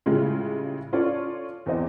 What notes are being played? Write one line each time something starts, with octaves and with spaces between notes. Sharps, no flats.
A2 C#3 G3 G#3 F4
C#4 F4 A4 C#5 D5
E2 C4 C5 D#5